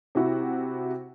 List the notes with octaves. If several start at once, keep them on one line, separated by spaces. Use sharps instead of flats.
C3 E4 F#4